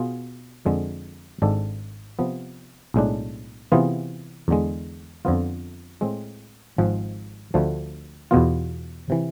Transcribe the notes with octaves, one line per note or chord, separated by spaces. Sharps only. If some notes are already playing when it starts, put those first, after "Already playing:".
Already playing: B2 B3 F4 G#4
F2 D3 G#3
G#1 G#2 G#3 D4 A4
C3 F3 B3
B1 A2 G#3 D4
C3 E3 B3 F4 G#4
E2 D3 G#3
F2 D3 F3 B3 F4
A2 G#3 C4
G#1 G#2 F3 G#3
D2 D3 F3 A3
E2 B2 B3 F4
C3 E3